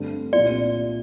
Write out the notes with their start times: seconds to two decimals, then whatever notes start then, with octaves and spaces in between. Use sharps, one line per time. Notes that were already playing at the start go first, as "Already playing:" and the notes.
Already playing: G2 D3 A3 C4
0.33 C2 A#2 F3 C4 F4 D5